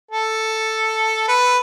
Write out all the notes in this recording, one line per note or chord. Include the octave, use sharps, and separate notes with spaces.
A4
B4